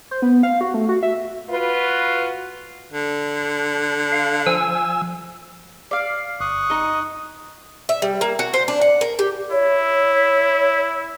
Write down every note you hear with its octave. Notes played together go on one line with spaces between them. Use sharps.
C5
B3
F5
F#4
A3
F#4
E5
F4 F#4 B4
D3
F5
F3 G#5 E6
D5 F5
G1 C#6 D#6 F#6
D#4 D#5
E5
G3
A#3
F#4
C5
D4
F#5
A#4
G4
E4 C#5